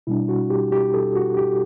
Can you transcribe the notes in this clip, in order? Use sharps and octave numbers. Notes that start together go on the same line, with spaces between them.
B2 G3 D4 E4
F#4
G4
G4
A4
F#4
G4